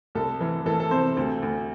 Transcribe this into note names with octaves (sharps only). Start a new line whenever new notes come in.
C2 A4
E3
E3 A4
A4
C3 C5
D2
D2